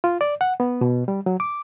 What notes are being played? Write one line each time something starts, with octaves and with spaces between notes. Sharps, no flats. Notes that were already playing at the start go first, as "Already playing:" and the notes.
F4
D5
F#5
B3
B2
G3
F#3
D6